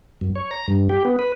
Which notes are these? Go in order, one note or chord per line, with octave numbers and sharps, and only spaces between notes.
F#2
C#5
A#5
G2
G4
B3
B4